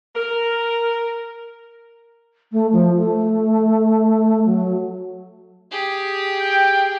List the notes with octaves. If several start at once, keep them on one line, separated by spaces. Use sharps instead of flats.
A#4
A3
F3
A3
F#3
G4 G#4
G5